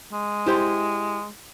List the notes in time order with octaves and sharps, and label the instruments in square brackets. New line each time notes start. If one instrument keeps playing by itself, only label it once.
[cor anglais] G#3
[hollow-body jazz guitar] E4 G4 C5